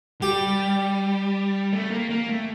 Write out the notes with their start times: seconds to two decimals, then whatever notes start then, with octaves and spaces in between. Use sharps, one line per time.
0.21 G3 G4
1.73 A3
1.91 A#3
2.10 A#3
2.29 A3